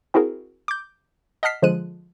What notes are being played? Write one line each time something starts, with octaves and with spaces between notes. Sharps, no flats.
C4 E4 F#4 G#4 A#4
D6 G6
D#5 F#5 A5 F6 B6 C7
D3 F3 G#3 F#6 D#7